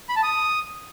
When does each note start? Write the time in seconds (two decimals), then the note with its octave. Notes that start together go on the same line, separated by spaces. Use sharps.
0.09 B5
0.16 A5
0.23 D#6